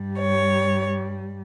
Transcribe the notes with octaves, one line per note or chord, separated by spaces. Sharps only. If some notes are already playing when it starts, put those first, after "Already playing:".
Already playing: G2 G3
C#5